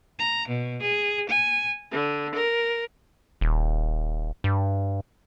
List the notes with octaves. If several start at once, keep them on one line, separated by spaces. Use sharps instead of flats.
A#5
B2
G#4
G#5
D3
A#4
D#1
G2